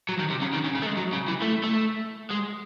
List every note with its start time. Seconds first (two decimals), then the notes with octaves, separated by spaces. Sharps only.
0.09 F#3
0.19 D#3
0.30 C3
0.42 C#3
0.53 D#3
0.64 C#3
0.75 C#3
0.82 A3
0.87 G#3
0.97 F#3
1.13 C#3
1.28 E3
1.42 A3
1.64 A3
2.31 G#3